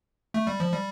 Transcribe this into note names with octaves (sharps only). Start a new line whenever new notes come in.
A3
G3
F3
G3